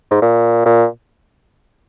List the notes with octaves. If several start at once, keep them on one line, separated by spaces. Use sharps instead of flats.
G#2
A#2
A#2